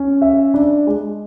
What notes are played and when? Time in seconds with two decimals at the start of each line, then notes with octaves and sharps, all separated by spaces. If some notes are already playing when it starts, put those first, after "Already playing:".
Already playing: C#4
0.22 E5
0.54 D4
0.87 G#3